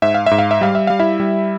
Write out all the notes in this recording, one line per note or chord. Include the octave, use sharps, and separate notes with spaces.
G#2 E5
F5
G#2 E5
F5
E5
G3 F5
E5
G3 F5
E4 E5
G3